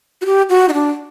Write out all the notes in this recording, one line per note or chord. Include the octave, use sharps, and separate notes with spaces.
F#4
G4
F#4
D#4
D4